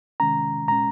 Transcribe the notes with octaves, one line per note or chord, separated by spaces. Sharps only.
C3 D#3 G#3 C#4 A#5
A#2 G#3 C#4 A#5